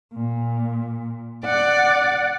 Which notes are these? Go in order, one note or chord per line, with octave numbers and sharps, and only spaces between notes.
A#2
D5 F#5